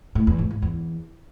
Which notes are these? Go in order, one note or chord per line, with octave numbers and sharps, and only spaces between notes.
A2
E2
G#2
G#2
E2